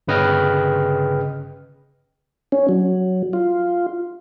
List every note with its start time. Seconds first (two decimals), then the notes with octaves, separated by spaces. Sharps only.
0.08 G1 C#3 B4 D#5 G5 F6
2.52 C#4
2.69 F#3
3.33 F4